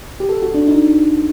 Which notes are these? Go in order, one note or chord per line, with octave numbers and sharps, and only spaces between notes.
G4
A4
F#4
D4
D#4